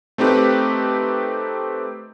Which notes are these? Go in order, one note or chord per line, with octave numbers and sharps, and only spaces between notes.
A3 C4 D#4 G4 B4